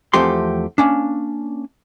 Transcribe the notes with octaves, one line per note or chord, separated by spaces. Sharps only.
E2 F3 A3 C4 G4 C6
A#3 C#4 D4